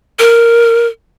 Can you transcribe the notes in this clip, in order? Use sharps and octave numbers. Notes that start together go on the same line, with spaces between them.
A#4